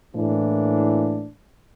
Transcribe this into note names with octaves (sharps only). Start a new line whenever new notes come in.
A2 E3 A#3 D4